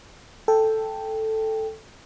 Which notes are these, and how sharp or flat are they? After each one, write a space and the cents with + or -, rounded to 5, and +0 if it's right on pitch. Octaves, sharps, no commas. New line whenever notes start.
A4 +0 G5 +5